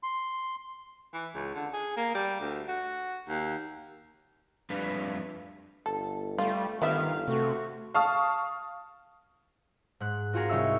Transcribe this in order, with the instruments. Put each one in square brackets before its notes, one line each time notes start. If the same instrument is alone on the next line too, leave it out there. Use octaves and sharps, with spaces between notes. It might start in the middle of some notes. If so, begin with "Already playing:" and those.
[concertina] C6
[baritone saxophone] E3
C#2
D3
G#4
A#3
G3
D2
F#4
D#2
[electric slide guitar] F2 G3 A3 D4 B4 F5
[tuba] G1 [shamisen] A4
[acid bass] G3 [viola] A3 [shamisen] F4
[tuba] G1 [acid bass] D#3 [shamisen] B3 G4 E5 [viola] F5
[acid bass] C3 [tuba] A3 [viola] F#4
[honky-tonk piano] F5 A5 C#6 D#6 F6
[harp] G#2 F#6
C4 F4 F#4 G#4 A#4
C2 D#4 C#5 E5 E6